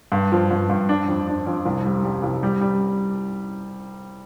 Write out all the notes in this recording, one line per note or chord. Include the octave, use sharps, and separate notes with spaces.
G2
F3
G2
G2
D4
F2
D4
F2
C2
G3
G3
C2
G3
G3